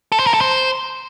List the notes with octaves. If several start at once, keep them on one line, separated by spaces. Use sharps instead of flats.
A4
C5
A#4
A4
C5